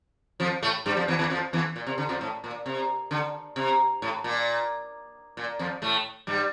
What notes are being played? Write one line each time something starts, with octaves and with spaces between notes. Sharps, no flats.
F2 F3
A2 A3
G2 G3
F2 F3
E2 E3
E2 E3
F2 F3
E2 E3
A#2
C3
D3
F2 F3
A2
A#2
C3
D3
C3
A2
A#2
A#2
F2 F3
A2 A3
G2 G3